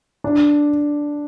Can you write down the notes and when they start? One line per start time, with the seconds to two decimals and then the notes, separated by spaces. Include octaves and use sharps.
0.24 D4